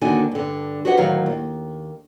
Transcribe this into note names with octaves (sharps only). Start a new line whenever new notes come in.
D#2 D3 D4 D#4 F#4 G#5
G2 D3
F#4 G4 B4 C#5 D#5 F#5
D2 A2 D#3 F#3 C#5 F5
D#2